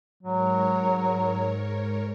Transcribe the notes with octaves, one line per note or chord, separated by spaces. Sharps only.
G#2 F#3 A#4 C#5